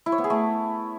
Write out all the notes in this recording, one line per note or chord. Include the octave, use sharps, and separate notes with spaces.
E4
C#5
B3
G#4
A3